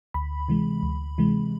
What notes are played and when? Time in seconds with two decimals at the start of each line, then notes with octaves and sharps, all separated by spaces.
0.14 D2 B5
0.49 C3 E3 G#3
0.83 D2
1.18 C3 E3 G#3